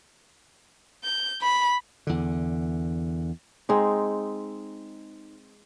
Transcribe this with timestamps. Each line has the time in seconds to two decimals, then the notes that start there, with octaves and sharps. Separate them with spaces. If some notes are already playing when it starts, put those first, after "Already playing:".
1.04 G6
1.42 B5
2.07 E2 D3
3.69 G#3 C4 D#4